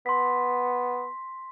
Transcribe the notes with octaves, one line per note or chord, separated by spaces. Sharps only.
B3 C6 B6